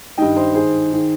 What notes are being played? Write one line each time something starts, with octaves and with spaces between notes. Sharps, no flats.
G2 D#3 D#5 G5
C5 D#5
G#2 D#3 G#4 C5
D#3